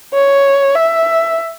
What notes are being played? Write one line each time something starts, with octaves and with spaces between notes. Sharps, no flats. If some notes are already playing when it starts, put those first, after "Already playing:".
C#5
E5